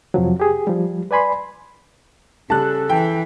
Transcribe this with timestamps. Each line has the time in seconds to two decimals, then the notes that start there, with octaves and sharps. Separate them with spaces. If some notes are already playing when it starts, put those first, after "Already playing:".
0.14 F2 C3 F3 F#3
0.40 G4 G#4
0.67 F3 G3
1.11 B4 D5 G#5 B5 C6
2.50 C#3 G3 A4 A5 F#6
2.89 E3 G5